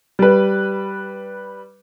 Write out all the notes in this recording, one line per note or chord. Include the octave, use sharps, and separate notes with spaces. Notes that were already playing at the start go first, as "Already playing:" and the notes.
G3 B4